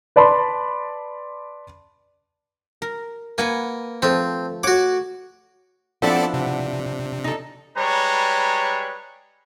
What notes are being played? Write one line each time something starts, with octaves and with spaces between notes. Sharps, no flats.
B4 D5 A5 B5 C6
A#4
A#3 B4 F#5 G#5
F3 A3 C4
F#4 C#5 F#5 D6
F3 B3 C4 D4 E4 A4 D5 F#5
C3
D#4 A4
G3 G#3 B4 C#5 A#5